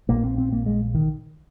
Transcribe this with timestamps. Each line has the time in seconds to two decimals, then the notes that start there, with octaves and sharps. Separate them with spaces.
0.09 A#1 A#2 A#3
0.24 C4
0.38 C4
0.52 A#3
0.66 G#3
0.95 D#3